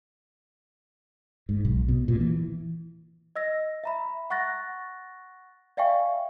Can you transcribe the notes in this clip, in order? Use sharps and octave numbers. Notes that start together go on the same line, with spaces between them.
G#2
B1
B2
A#2
E3
D#5 E6 A#6
E5 A#5 B5
F#5 C#6 F#6 A6 A#6
D5 E5 F5 G5 G#5 C#6